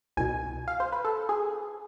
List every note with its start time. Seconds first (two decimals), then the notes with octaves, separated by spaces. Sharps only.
0.17 C2 B2 G#5
0.68 F5
0.80 C5
0.92 B4
1.05 A4
1.29 G#4